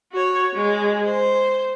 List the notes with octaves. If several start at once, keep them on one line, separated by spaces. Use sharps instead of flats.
F#4 C#5
G#3
C5